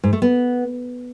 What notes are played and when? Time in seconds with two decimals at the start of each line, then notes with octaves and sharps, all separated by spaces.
0.04 G#2
0.13 A3
0.22 B3